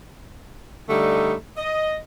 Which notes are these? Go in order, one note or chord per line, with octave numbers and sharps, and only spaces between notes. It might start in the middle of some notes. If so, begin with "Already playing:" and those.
D3 G3 A3 D#4
D#5